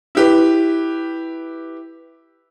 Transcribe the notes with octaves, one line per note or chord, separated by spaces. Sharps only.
E4 G4 B4